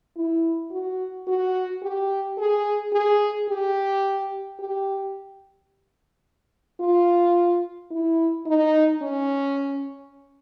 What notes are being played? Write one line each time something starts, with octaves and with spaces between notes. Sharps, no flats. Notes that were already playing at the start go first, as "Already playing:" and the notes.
E4
F#4
F#4
G4
G#4
G#4
G4
G4
F4
E4
D#4
C#4